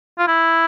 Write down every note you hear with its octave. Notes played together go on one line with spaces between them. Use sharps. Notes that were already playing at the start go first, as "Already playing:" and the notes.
F4
E4